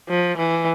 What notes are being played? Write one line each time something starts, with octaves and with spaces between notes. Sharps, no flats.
F3
E3